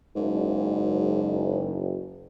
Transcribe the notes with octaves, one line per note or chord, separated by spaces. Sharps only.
F#1 G#2